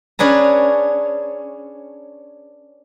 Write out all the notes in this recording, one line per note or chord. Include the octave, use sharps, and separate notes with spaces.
C#4 D4 G#4 B4 A#5